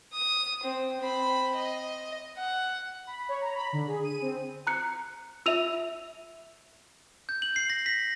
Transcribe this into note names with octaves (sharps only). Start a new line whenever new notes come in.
D#6
C4
C4 B5
D#5
F#5
B5
C#5
A#5
B5
D3
G#4
D#7
C4
A#5 F#6 C#7
F4 E5 E6 D#7 F7
G6
F#7
C7
A#6
B6